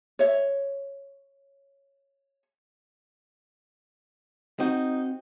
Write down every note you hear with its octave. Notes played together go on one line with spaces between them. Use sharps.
C#5 E5
C4 D#4 F#4